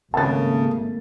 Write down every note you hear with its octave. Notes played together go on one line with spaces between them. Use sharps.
G#1 C#3 A3 A#3 A5 A6